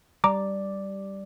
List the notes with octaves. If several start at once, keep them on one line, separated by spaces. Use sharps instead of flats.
G3 D5 A#5 D6